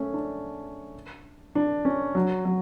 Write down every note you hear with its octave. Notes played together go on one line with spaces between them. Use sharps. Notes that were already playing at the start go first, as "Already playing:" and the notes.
Already playing: A3 C#4
D4
D4
C#4
F#3
F#3